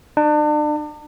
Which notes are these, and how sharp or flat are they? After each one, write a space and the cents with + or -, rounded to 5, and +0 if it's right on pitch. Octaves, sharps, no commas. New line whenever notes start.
D4 +35